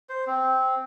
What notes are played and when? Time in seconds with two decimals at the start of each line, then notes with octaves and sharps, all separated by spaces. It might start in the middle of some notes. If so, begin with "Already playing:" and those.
0.09 C5
0.27 C4